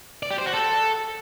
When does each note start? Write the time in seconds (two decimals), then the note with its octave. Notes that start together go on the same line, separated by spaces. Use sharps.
0.23 D5
0.31 G4
0.38 C5
0.46 F#4
0.54 A4